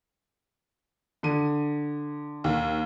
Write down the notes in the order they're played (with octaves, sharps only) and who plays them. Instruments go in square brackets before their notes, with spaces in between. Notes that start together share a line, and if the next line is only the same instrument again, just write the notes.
[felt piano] D3 D#7
[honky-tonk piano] D#2